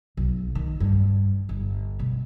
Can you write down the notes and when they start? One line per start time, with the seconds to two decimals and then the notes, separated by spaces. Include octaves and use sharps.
0.17 B1
0.55 D#3
0.80 G2
1.49 G1
1.99 B2